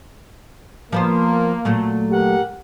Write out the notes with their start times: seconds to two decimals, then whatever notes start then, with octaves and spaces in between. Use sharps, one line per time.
0.92 F3 A#3 B3 C5
1.65 A#2 F#3 A3
2.11 G4 A#4 F#5